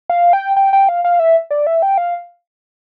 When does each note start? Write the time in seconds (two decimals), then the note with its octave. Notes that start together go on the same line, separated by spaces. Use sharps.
0.10 F5
0.33 G5
0.57 G5
0.73 G5
0.89 F5
1.05 F5
1.19 E5
1.51 D5
1.67 E5
1.82 G5
1.98 F5